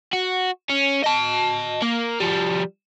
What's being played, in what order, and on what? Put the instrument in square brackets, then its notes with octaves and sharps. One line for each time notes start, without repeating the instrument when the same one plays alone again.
[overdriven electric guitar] F#4
C#4
D#5 A5
A#3
F3 G3